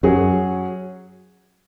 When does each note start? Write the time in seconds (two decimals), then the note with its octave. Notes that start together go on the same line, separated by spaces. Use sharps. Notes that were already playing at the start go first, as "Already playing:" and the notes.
0.03 F#2 F#3 C#4 G#4